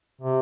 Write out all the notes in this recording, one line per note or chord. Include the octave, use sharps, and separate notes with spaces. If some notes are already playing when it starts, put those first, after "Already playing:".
C3